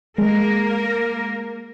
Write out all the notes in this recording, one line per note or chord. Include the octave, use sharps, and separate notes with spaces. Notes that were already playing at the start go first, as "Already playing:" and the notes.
G#3 A#3 A#4